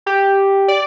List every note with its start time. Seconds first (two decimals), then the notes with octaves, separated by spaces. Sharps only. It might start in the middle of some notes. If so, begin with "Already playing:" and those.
0.06 G4
0.68 D5